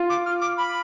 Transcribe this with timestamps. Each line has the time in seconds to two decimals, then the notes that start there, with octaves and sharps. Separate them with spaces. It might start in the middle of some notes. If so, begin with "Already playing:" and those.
Already playing: F4
0.09 D6
0.25 F6
0.41 D6
0.57 B5